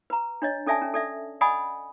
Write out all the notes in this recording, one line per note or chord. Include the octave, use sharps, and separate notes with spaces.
B4 A#5
D4 C#5 D#5
C#4 A4 D5 E5 G#5 A5
C#4
A4 D5 E5
D5 D#5 F#5 G#5 B5 D#6